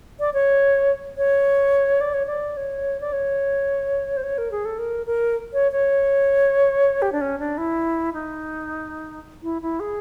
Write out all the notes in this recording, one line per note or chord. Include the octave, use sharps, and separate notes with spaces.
D5
C#5
C#5
D5
C#5
D5
C#5
D5
C#5
C5
C#5
A#4
G#4
A4
A#4
A#4
C#5
C#5
G4
D4
C#4
D4
E4
D#4
E4
E4
G#4